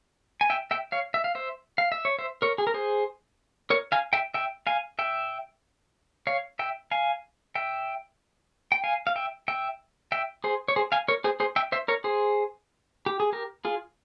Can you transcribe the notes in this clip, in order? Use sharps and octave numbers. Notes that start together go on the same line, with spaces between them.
G#5
E5 G5
E5 G5
C#5 F5
E5
F5
C5 E5
F5
E5
C#5
C5 E5
A#4 C#5
G#4
A#4
G#4 C5
A#4 C#5
F5 G#5
E5 G5
E5 G5
F5 G#5
E5 G5
C#5 F5
E5 G5
F5 G#5
E5 G5
G5
F5 G#5
F5
E5 G5
E5 G5
E5 G5
G#4 C5
C#5
G#4 C5
F5 G#5
A#4 C#5
G#4 C5
G#4 C5
E5 G5
C5 E5
A#4 C#5
G#4 C5
G4
G#4
G4 A#4
F4 G#4